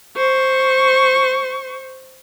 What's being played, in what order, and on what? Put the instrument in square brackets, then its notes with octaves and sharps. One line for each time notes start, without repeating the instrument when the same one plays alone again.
[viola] C5 C#6